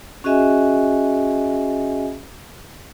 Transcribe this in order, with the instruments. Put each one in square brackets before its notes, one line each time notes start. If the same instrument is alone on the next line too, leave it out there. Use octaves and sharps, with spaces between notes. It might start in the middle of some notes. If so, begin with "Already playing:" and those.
[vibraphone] C#4 F#4 G#4 D#5 E5 G#5